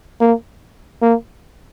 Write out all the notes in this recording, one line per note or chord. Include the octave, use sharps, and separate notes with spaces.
A#3
A#3